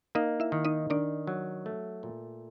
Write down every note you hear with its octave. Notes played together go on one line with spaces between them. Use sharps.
A#3 D#4 D#5
E4 E5
D#3
D#4 D#5
D#3 D4 D5
F#3
A3
A#2